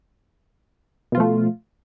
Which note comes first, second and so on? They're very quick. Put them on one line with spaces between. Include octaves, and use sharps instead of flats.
B2 F4 F3 A3